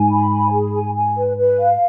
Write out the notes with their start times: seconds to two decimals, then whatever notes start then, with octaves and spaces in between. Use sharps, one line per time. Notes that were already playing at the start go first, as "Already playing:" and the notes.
Already playing: G#2 G#5
0.10 B5
0.31 G#5
0.52 G#4
0.73 G#5
0.95 G#5
1.17 B4
1.37 B4
1.59 F5